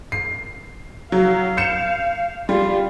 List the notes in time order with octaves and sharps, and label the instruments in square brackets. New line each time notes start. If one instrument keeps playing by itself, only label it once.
[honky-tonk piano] C7
[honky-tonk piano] F#3 [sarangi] F5
[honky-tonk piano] G6 C#7 E7
[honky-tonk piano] G3 [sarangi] F4